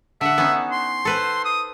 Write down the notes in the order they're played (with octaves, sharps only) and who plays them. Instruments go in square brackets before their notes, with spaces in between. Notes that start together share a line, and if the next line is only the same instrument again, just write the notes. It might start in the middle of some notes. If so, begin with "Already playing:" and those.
[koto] D3 F#5 [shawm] E5
[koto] B3 C#4 D#4
[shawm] C6
[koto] A4 B4 C5
[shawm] D#6